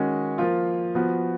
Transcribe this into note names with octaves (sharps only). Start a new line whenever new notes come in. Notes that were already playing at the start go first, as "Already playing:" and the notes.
Already playing: D#3 G#3 C#4 F#4
F3 A#3 F4
F3 B3 F#4